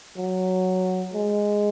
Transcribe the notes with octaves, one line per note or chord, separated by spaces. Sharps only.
F#3
G#3